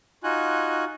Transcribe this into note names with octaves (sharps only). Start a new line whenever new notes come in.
D#4 F4 F#4 G#5 F#6